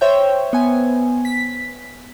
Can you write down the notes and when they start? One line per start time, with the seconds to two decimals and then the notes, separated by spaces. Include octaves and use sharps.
0.01 C5 C#5 E5 G5
0.53 B3 G#5
1.25 B6